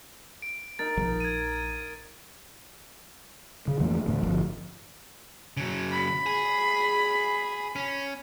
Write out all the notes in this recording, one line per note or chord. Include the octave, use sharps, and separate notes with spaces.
D7
D#4 A#4 A6
A#1 F3
G#6 D#7
C#3
F2 E3 A3 A#3
D2 A2
G1 C#2 F3
C#3 F#3
B5
G#4
C#4